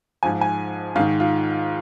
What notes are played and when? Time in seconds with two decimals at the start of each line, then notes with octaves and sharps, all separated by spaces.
0.23 G#2 F3 G#5
0.41 G#5
0.96 G#2 F5
0.99 D#3
1.20 F4